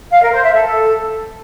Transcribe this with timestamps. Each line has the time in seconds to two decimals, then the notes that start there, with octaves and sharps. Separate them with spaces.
0.11 F5
0.21 A#4
0.32 C5
0.43 E5
0.54 A4